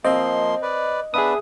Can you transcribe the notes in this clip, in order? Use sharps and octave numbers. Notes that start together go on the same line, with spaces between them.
F3 A#3 C4 D#5 C6
B4 D5
B3 D4 G#4 B4 E5 D#6